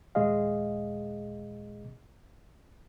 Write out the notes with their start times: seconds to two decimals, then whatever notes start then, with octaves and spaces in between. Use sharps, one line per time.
0.15 D#2 A#2 G#3 G#4 D#5 F5